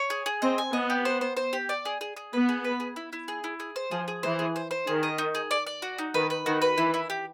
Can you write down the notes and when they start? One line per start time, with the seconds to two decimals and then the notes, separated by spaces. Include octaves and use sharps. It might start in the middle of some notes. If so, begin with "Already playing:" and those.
Already playing: C#5
0.10 G#4
0.26 G#4
0.42 C4 D#5
0.58 G#5
0.73 B3 D#5
0.90 G4
1.05 C5
1.21 C5
1.37 C5
1.53 G4
1.69 D5
1.85 G#4
2.01 G#4
2.16 G#4
2.33 B3 B4
2.49 G#4
2.64 B4
2.80 G#4
2.96 E4
3.13 E4
3.28 G#4
3.44 E4
3.60 G#4
3.76 C5
3.91 F3 G#4
4.08 G#4
4.23 E3 C5
4.39 G#4
4.56 C5
4.71 C5
4.87 D#3 G#4
5.03 D#5
5.18 D#4
5.35 G#4
5.51 D5
5.67 D5
5.82 F#4
5.98 D#4
6.14 D#3 B4
6.30 B4
6.46 D#3 F#4
6.62 B4
6.78 E3 E4
6.94 E4
7.10 G4